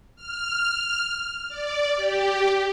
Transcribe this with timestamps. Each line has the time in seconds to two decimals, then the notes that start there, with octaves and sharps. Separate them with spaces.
0.16 F6
1.49 D5
1.97 G4